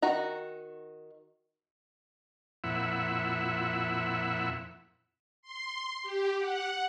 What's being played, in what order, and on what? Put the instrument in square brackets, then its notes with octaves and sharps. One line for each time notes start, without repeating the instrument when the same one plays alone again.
[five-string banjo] D#3 F#4 A#5
[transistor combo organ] F2 A#2 E4 E5 F#5
[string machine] C6
G4
F#5